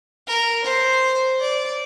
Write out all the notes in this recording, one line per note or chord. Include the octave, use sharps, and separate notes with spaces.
A#4
C5
D5